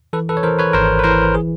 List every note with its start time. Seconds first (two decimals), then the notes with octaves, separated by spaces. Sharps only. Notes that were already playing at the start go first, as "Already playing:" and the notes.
0.13 E3 A4 B4
0.29 A4 B4
0.37 C#5
0.43 E3 A#4 C5
0.59 B4 C#5
0.73 G#1 A#4 C5
0.99 B4
1.04 E3 A#4 C5
1.35 G#4